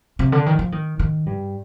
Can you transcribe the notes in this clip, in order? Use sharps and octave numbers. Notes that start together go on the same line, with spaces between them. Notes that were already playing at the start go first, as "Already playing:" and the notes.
C3
D3
D#3
F3
D#3
D#3
G2